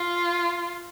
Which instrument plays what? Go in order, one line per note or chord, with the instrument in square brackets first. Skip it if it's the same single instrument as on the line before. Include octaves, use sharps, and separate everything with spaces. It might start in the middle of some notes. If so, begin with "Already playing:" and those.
Already playing: [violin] F4